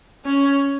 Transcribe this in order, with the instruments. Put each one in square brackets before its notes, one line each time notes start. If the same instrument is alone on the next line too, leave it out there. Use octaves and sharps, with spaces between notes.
[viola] C#4